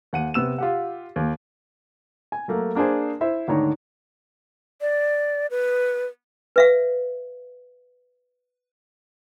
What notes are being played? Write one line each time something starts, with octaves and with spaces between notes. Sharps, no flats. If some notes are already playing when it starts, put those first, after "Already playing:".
D#2 F#5 D#7
C3 B3 E6 E7
F4 G4 F#5
D#2
G#5
F#3 A3 A#3
A#3 D4 G#4 C5 G#5
E4 C5 E5
D2 G#2 D#3 D4 C#5 A#5
D5
B4
B4 E5 F5